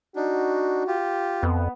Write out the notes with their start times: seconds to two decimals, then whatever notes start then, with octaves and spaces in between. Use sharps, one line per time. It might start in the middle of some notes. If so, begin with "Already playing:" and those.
0.16 D4 D#4 F#4
0.87 F4 G4
1.43 F2 B3